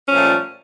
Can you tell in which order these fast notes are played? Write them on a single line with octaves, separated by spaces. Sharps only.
C#4 F3 A#2 A3 G3